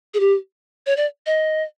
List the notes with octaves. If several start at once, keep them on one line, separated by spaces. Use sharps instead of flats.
G#4
G4
C#5
D5
D#5